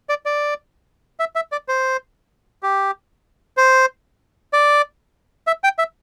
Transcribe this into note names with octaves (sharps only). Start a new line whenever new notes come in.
D5
D5
E5
E5
D5
C5
G4
C5
D5
E5
G5
E5